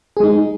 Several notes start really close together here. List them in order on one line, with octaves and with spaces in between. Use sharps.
G#4 G#3 D#4